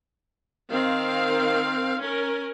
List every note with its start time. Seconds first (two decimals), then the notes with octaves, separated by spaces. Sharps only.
0.71 D#3 C4 F5
2.01 C#4 A#4